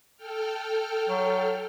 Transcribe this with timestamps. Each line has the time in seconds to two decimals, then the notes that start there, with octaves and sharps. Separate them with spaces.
0.17 A4 G5 F6
1.09 F#3